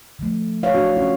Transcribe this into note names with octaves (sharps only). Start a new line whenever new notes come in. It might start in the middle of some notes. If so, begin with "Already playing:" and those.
D3 F3 A3
C#5 F5
D4 F#4
C#4 F4